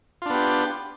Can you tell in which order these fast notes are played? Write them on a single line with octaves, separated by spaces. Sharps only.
F4 D4 B3 G4